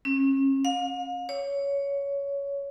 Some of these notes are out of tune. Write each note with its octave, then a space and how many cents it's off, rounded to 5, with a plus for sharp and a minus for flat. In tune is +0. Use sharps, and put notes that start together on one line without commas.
C#4 -35
F5 +40
C#5 +15